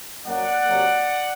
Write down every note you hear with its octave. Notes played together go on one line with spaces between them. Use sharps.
F#2 F#3 A#3 D5 F#5
C3 F#3 A#3